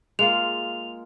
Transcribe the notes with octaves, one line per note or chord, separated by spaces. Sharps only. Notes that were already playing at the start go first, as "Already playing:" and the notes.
G#3 A#3 F4 F7